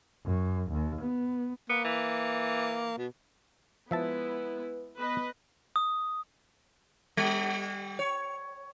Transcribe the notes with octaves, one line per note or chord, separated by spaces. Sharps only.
F#2
D#2
B3
A#3 B3
E3
B2
F3 G#3 B3 E4 B4 E5 A5
B3 B4 D#5
D#6
G3
C#5